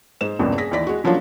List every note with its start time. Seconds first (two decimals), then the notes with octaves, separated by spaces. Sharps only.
0.21 G#2 C5 E7
0.39 E1 A#1 G2 C#3 B3
0.58 G#4 A#6 B6
0.71 D#2 E3 D5 B6
0.87 G#3 F#4
1.04 C#3 F3 F#3 A#3 D4 F4